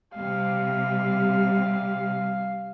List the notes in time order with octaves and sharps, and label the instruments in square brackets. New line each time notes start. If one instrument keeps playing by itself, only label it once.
[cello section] C3 G3 [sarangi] F5